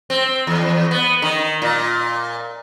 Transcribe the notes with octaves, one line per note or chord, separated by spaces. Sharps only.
C4
E2
B3
D#3
A#2